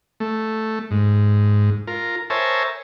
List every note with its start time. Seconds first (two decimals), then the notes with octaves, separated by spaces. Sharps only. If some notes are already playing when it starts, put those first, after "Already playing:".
0.20 A3
0.91 G#2
1.87 F4 A#4
2.30 A#4 C5 C#5 E5 G#5 A5